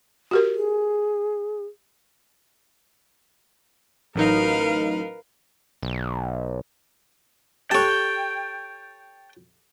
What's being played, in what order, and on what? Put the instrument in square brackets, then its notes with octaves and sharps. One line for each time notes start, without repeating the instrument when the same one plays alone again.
[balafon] F#4 G4 A#4
[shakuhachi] G#4
[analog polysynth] A1 F#3 D#4 [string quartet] A#4 B4 F5
[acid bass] B1
[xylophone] G4 A4 F#6 [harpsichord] C#5 A5 [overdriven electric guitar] G5